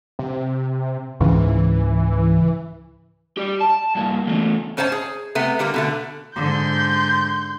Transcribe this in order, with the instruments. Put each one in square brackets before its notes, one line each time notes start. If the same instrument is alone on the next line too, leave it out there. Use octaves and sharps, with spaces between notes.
[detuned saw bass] C3
[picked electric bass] C#2 G#2 C#3 [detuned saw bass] E3
[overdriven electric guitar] G4 D5
A5
G2 A#3
E2 A3
[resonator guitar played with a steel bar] G#2 C#4 C5 C#5 G#5 A5
G#4
C3 A3 B3
D3 G3 A#3
B2 D3 A3
[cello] G#2 D3 [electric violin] C6 G6